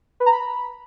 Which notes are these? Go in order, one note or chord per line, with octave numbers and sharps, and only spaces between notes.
B4
A#5
B5